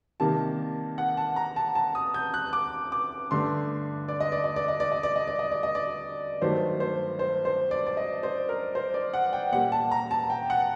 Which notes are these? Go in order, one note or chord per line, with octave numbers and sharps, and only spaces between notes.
C3 D#3 G3 A#3 A5
F#5
A5
A#5
A5
A5
D#6
G6
F#6
D6
D6
G2 D3 A3 C6
D5
D#5
D5
D#5
D5
D#5
D5
D#5
D5
D#5
D5
D#5
D5
D#5
D5
G2 D#3 F#3 A3 C5
C5
C5
C5
D5
D5
D#5
C5
A#4
C5
D5
F#5
G5
A#2 G3 A#3 F#5
A5
A#5
A5
G5
F#5